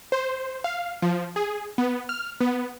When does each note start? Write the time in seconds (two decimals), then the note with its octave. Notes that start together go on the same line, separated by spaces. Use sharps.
0.12 C5
0.64 F5
1.02 F3
1.36 G#4
1.78 B3
2.09 F6
2.41 B3